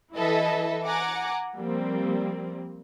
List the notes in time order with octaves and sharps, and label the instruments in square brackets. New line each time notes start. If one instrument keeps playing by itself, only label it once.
[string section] E3 E4 A4 B4 D#5 E5
F#5 G#5 A#5 D6
F3 G3 A#3 C4